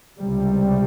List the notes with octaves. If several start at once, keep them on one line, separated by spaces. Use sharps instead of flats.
C#2 C3 G3